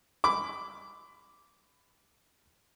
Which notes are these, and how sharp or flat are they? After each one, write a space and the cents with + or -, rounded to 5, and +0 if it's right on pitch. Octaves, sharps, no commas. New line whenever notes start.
B5 +20 D6 -10